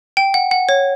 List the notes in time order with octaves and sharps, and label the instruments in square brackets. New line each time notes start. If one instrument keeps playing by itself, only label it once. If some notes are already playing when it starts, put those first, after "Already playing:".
[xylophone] G5
F#5
F#5
C#5